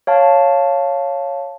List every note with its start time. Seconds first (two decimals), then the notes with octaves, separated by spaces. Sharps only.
0.07 C#5 F5 A5